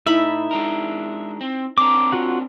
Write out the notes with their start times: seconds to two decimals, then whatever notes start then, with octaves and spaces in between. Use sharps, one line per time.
0.06 A2 D#4 E4 E5 B5
0.51 G#3 D4 A#4
1.41 C4
1.78 C4 D4 A#4 D6
2.12 F4 F#4 F#5